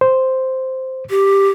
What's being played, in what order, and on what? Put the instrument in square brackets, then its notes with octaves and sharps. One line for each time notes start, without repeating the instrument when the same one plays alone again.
[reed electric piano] C5
[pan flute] G4